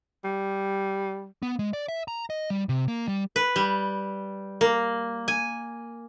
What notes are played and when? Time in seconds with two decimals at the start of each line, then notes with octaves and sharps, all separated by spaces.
0.24 G3
1.43 B3
1.59 G#3
1.73 D5
1.88 E5
2.08 A#5
2.30 D#5
2.50 G3
2.69 C3
2.88 A#3
3.08 G3
3.36 B4
3.56 G3
4.61 A#3
5.28 G#5